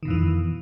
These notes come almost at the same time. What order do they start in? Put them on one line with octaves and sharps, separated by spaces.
D#3 B2 F2 E3